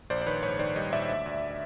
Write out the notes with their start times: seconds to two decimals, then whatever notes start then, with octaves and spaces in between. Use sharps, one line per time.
0.10 A#1 C5 D5
0.21 D5
0.26 D#3 B4 C#5
0.43 G#2 B4 C#5
0.59 D#3 C5 D5
0.76 G3 C#5 D#5
0.92 A#1 D5 E5
1.09 D2
1.26 D2